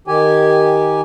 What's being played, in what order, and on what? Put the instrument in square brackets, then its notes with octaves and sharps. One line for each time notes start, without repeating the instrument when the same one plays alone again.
[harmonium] D#3 G4 G#5